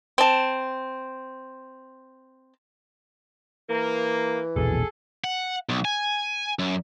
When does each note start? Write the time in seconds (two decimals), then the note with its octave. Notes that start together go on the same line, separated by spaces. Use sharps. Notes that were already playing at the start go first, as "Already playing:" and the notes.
0.18 C4 A5
3.69 E3 A#3
4.56 A#1 E2 B2 G#4 A4
5.24 F#5
5.69 B1
5.85 G#5
6.59 F#2